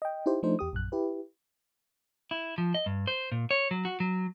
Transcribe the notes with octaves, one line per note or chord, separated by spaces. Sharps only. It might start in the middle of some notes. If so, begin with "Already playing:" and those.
D#5 G5
D#4 E4 G4 C5
F3 A3 D4 D#4 C5
E2 G4 D#6
A#1 F#2 F#6
E4 G4 B4
E4
F3
D#5
G2
C5
A#2
C#5
F#3
F#4
F#3